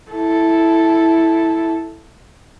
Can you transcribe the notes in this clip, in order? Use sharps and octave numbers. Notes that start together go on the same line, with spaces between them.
E4 A4